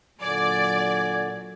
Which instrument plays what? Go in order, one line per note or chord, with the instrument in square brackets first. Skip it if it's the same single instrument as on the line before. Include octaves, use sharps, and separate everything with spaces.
[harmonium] A#2 D3 [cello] F#3 [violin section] D5 [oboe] G#5